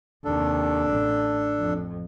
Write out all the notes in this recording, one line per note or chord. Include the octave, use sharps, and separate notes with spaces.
D#2 C3 D4 A4
A1
F2